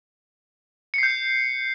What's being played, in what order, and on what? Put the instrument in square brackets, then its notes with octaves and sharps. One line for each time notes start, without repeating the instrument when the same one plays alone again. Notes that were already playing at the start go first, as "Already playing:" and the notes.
[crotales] C#7
C7
G6